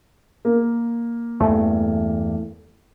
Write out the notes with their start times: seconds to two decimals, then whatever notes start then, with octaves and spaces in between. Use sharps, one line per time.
0.45 A#3
1.40 E2 G2 E3 A3